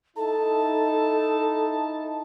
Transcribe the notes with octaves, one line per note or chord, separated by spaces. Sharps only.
D#4 E4 A4 A5